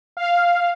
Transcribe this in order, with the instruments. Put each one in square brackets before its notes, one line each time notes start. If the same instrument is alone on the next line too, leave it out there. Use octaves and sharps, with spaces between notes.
[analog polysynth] F5